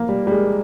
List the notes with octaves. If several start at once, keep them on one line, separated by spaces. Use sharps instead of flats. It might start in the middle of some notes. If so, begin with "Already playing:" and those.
Already playing: A#3
G3
G3
G#3